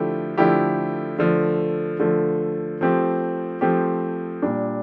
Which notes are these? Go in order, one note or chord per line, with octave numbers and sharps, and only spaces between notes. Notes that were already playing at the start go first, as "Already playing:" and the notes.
Already playing: D3 F3 A3 E4 G4
D3 F3 A3 E4 G4
D3 F3 A3
D3 F3 A3
F3 A3 C4 G4
F3 A3 C4 G4
A#2 G3 D4